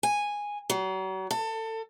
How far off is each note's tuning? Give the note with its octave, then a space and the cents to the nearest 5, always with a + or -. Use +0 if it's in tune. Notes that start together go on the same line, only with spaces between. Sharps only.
G#5 -10
F#3 +40
A4 +25